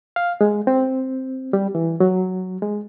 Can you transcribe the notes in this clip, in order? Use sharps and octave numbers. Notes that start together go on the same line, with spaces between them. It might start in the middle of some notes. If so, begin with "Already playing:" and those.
F5
G#3
C4
G3
E3
F#3
G#3